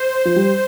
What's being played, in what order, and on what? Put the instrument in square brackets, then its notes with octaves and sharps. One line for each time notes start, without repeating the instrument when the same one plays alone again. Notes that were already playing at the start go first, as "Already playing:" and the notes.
Already playing: [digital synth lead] C5
[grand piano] F3
G3